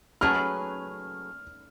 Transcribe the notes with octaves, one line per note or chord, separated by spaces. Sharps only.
F#3 A3 C#4 G#4 B4 F6